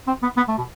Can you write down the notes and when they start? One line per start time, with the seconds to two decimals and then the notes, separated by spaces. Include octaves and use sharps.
0.07 C4
0.22 B3
0.37 B3
0.48 A3
0.58 B2